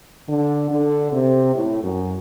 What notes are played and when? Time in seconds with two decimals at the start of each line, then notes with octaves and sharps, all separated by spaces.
0.29 D3
0.71 D3
1.13 C3
1.56 A2
1.84 F#2